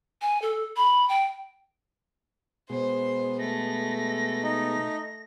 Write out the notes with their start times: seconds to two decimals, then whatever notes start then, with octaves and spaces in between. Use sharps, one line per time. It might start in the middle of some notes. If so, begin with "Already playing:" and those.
0.22 G#5
0.42 A4
0.76 B5
1.09 G5
2.70 B2 G#3 C5
3.39 A3 A#6
4.43 D#4